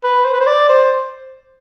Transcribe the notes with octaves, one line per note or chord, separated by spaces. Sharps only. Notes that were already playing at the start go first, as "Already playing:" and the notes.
B4
C5
B4
C5
D5
C5